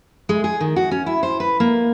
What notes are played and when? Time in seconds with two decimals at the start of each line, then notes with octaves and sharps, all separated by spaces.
0.29 G#3
0.44 G#4
0.60 D#3
0.76 F#4
0.91 C#4
1.06 E4
1.23 C5
1.40 B4
1.60 A#3